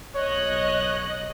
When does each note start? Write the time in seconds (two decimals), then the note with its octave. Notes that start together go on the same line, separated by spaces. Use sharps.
0.16 B1 C#5 D#5 F#6